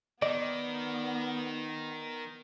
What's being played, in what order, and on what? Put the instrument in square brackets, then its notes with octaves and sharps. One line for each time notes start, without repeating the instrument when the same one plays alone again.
[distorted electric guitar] D#3 [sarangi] B3 [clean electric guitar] D5 [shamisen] D#5